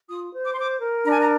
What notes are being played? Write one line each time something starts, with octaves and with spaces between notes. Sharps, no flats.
F4 D#6
C5
D6
C6
C5 D6
A#4
D4 A#5
G#5
A#5